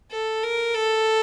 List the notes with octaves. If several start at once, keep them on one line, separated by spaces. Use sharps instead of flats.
A4
A#4
A4